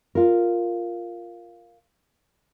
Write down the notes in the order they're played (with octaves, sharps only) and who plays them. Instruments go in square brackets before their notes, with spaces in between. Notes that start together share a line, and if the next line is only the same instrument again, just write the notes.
[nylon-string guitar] F4 A#4